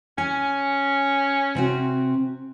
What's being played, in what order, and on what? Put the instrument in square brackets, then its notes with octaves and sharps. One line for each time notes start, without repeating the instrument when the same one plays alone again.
[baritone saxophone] C#4 [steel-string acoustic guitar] G#5
[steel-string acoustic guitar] C3 C4 F#4